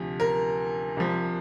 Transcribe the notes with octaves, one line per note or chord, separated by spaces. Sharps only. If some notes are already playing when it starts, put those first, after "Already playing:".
Already playing: D2 C3 F3
A#4
C2 C3 F3